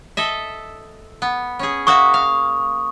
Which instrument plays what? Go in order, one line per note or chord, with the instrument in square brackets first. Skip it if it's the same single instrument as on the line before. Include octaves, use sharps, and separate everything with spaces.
[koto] A4 D#5 E5
B3
C#4 G#4
[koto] A#3 F#4 E5 [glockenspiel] C#6 D#6
[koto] F5